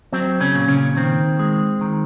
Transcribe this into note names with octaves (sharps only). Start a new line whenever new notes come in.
F#3 C4
C#3 C#4
A#2
C#3 C#4
D#3 C4
G#3
D#3